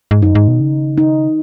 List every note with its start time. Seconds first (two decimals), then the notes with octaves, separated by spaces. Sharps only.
0.11 G#2
0.22 F#2 D#4
0.35 G#2
0.48 B2
0.60 C#3
0.98 D#4